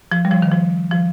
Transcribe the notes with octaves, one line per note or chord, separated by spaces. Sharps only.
F3
G3
F3
D#3
F3
F3